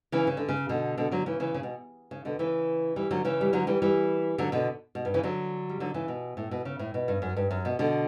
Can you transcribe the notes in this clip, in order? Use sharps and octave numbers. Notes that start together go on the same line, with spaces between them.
C#3 E3
C#3
D3
C#3
B2 D3
B2 D3
D3 F#3
C#3 E3
C#3 E3
C#3
B2
C#3
B2 D3
C#3 E3
E3 G3
D3 F#3
C#3 E3
G3
D3 F#3
E3 G3
E3 G3
D3 F#3
B2 D3
B2
G2
C#3 E3
D3 F#3
G3
D3 F#3
C#3 E3
B2
A2
B2
C#3
A2
B2
G2
F#2
G2
F#2
B2
B2 D3